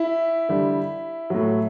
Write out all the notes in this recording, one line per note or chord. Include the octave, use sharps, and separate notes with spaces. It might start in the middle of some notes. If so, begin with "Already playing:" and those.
Already playing: E4
D3 G3
A2 F#3